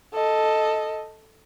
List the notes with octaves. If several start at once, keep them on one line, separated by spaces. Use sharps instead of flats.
A4 D#5